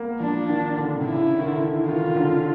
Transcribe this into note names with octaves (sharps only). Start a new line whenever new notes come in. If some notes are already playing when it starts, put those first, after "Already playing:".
Already playing: A#3 B3
F3 D4
D#3
D3
C3
C#3 E4
D#3
D3
E3
D#3 F4
C#3
D3